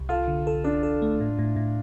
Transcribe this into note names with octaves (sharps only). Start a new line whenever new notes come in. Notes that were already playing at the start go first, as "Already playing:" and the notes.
Already playing: C2
F4 A4
D3
A4
D4 A4
A4
A3
A2
A2
A2